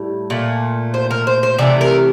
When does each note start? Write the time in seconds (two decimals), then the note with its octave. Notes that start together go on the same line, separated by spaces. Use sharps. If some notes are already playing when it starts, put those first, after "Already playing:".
Already playing: A2 G3
0.30 A#2 A3
0.94 C5
1.11 A#4
1.27 C5
1.43 C5
1.58 C3 E3 A3 D5
1.81 A#4